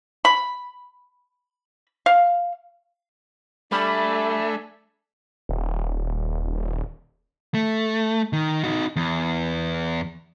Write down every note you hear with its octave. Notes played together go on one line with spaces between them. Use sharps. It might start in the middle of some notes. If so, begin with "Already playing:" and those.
B5
F5
G3 A3 D4 E5 G#5 B5
D#1
A3
D#3
D#4 F#4
E2